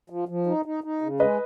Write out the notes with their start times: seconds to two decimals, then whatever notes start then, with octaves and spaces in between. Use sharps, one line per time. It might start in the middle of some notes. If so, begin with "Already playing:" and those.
0.10 F3
0.29 F3
0.46 D#4
0.65 D#4
0.84 D#4
1.02 C#3
1.20 G#3 B4 D#5